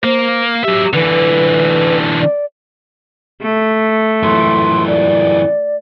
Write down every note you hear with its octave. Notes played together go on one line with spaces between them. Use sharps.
A#3 C5
F#3 G4 E5
D3 E3 B4
D5
A3
F#2 E3 C6
D5